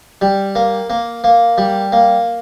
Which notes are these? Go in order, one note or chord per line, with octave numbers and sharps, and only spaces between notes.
G3
A#3
A#3
A#3
G3
A#3